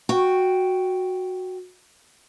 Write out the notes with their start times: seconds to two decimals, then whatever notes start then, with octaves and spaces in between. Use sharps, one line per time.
0.09 F#4 G5